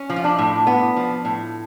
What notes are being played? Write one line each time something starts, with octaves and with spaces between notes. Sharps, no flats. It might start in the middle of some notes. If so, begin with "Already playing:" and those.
Already playing: C#4
F3
F4
D4
A2
B3
F3
A2